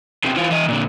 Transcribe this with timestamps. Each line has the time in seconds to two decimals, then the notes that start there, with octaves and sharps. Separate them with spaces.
0.24 E2 C3
0.36 E3 F4
0.51 E3 D#5
0.68 A#2 D3